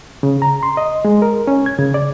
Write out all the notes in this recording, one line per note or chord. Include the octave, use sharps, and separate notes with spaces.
C#3
A#5
C6
D#5
G#3
A#4
C#4
G#6
C#3
D5